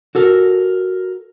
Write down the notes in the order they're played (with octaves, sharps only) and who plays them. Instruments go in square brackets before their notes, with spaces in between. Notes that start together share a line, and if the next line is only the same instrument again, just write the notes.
[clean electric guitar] F#4 A4 A#4